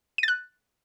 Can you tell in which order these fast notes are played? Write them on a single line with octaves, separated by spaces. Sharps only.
D#7 A6 F#6